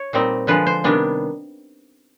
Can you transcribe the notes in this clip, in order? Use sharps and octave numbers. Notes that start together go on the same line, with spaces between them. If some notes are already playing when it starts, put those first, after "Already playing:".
Already playing: C#5
A#2 G3 C4 D#4
D3 F3 G#3 B4
C5
C3 D#3 G3 B3 D4